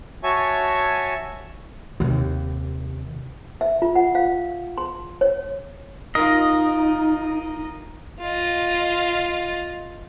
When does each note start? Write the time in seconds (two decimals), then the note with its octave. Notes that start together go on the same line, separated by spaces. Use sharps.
0.24 F#4 C#5 E5 G#5 A5 C#6
2.00 D#2 C3
3.61 E5
3.82 F4
3.95 F#5
4.15 F5
4.78 C6
5.21 C#5
6.15 D#4 F4 A#4 D#5
8.21 F4 D#5